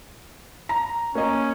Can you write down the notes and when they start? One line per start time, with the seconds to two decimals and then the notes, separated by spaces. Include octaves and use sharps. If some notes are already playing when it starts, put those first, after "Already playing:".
0.69 A#5
1.15 A#3 C#4 D#5